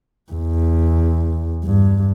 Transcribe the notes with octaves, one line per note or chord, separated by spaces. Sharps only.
E2
G2